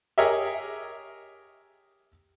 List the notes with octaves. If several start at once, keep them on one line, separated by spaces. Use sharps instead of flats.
G4 G#4 A#4 C#5 D#5 E5